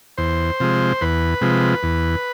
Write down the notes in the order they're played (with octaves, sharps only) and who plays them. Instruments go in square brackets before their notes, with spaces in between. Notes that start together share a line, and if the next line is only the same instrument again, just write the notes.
[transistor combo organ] E2 C5
C3 F3 G#3
E2 B4
C3 F3 G#3
E2